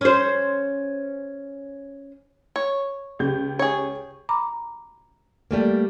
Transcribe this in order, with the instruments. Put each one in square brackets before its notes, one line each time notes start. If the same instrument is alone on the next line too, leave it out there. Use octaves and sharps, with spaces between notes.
[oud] C#4 C5
[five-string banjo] C#5
[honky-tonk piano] C#2 G4 G6
[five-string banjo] G#4 C#5
[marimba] A#5 B5 D6
[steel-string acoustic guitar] G3 A3 A#3